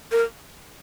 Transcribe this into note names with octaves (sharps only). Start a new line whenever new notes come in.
A#4